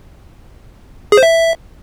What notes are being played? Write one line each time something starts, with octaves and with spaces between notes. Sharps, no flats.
G#4
C5
E5